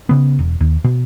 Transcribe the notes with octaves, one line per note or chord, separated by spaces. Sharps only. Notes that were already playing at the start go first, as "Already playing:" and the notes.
C#3 B3
E1
D#2
B2